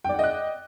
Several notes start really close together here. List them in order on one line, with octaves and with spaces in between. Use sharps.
G5 D5 F#5 D#5 F#6